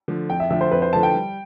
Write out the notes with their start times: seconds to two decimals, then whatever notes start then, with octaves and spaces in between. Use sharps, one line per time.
0.08 D3 F3 A3
0.30 F2 G5
0.40 E5
0.50 D3 F3 A3 E5
0.61 C5
0.71 F2 B4
0.82 C5
0.92 D3 F3 A3 A5
1.03 G5
1.14 G3